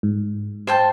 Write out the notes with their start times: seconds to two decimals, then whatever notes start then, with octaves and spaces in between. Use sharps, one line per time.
0.03 G#2
0.67 C5 G5 A5